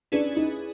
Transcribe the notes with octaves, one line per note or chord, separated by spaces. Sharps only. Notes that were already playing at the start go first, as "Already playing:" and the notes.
C#4 D4 E4 G#4 B4 D5
D#4